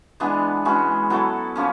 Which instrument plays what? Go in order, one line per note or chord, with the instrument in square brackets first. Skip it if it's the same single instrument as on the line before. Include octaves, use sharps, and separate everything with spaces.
[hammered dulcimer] E3 G#3 B3 D4
E3 G#3 C#4 F#4
F#3 B3 E4 A4
F3 A#3 C#4